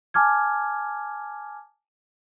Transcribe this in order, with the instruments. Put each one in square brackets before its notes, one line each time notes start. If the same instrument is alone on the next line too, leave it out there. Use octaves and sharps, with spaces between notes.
[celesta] G#5 A5 D6 F6 G#6